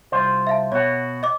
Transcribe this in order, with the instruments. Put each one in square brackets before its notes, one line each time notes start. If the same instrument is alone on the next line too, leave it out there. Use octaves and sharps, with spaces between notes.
[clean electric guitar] C2 F4 C5
[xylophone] E5 F5 A5
[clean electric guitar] B2 F#4 [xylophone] C#5
[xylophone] D#5 D6